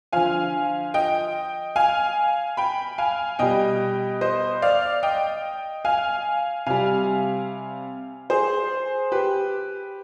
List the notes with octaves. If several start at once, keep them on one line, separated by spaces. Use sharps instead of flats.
D3 F3 F5 G#5
D#5 G5
F5 G#5
G5 B5
F5 G#5
B2 G3 D#5 G5
C5 D#5
D5 F5
D#5 G5
F5 G#5
C3 G3 F5 G#5
G#4 C5
G4 B4